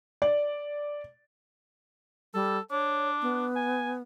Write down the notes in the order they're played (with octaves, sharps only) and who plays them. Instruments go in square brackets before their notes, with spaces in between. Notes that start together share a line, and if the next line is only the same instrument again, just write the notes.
[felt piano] D5
[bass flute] G3 [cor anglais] A4
[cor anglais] D4 [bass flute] C#5
[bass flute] B3
[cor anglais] G#5